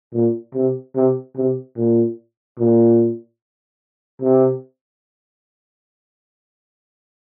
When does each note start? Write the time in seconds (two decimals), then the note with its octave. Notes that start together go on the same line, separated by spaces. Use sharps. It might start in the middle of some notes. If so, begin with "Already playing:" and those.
0.14 A#2
0.54 C3
0.95 C3
1.36 C3
1.77 A#2
2.59 A#2
4.21 C3